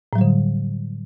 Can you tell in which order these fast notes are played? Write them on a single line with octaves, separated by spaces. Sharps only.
A2 F#3 G3 D3